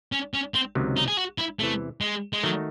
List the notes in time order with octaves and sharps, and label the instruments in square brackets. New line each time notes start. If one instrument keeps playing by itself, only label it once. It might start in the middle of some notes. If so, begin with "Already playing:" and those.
[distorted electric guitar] C#4
C#4
C4
[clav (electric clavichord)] C#2 C3 D#3 F#3
[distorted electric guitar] D#4
G#4
F#4
E4
[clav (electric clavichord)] E2 C3 E3 [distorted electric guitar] A3
[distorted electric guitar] G#3
G#3
[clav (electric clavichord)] D#3 A3 D#4 F#4 [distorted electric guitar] F#3